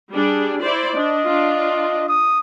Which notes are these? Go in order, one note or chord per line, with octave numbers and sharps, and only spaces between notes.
G3 D4 G#4
E4 C5 D5
D4 D#5
D4 F4
D#6